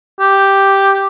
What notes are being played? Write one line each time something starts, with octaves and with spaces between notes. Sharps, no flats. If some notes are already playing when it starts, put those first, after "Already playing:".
G4